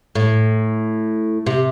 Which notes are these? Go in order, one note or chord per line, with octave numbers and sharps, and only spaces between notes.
A2
C3